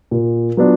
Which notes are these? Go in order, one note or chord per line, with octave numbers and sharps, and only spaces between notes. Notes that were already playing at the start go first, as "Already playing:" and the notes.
A#2
F#3 B3 D4 F4